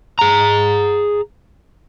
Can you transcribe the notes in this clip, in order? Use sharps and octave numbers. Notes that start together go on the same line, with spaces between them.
G#4 A#5